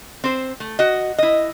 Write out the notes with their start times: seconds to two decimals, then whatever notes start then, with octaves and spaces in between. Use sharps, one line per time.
0.24 C4 C5
0.60 A3
0.79 F#4 D#5
1.18 E4 D#5